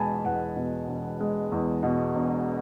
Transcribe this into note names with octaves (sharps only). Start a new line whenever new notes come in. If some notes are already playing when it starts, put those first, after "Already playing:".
Already playing: E1 E2 B2 G#3 G#5 A5 B5
E2 F#5
B2
E1
G#3
E2
B2
E1